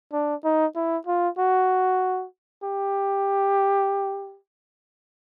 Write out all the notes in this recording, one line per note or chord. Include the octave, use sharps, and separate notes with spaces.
D4
D#4
E4
F4
F#4
G4